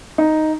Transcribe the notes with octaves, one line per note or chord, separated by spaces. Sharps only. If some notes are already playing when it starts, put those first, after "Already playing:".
D#4